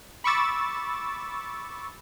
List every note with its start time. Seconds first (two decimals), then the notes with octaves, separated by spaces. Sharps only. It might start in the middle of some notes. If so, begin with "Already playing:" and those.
0.24 B5 C#6 D6 E6 A6